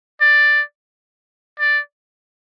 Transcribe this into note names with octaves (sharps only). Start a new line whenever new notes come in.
D5
D5